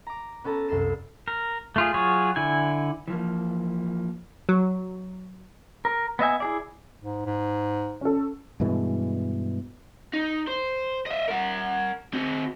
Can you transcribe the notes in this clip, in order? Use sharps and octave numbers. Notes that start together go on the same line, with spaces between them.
A#5 D6
B3 C#4 A4 A5 A#5
C2 F#2 A4 C7 E7
A#4
A3 F4 G#4
F#3 F4 G#4 C#5
D3 E4 G#5
E3 F3 A#3
F#3
A#4
B3 D#5 E5 G#5
E4 G#4 D5
G#2
G#2
C#4 A4
G2 B2 E3 G#3
D#4
C5
D#5 E5
A#4 F#5
C4 F#4